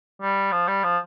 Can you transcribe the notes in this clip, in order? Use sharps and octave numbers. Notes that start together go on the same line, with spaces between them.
G3
F3
G3
F3